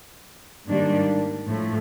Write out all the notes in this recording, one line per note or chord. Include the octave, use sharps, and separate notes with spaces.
G#2 D#3 G3 A#3 D4
A2 F3 A3